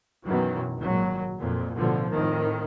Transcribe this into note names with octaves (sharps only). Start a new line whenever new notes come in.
F#2 B2 D#3 E3 F#3
G#1 A#2 F#3
F2 A#2
A1 B2 D3 F3
F2 A2 D#3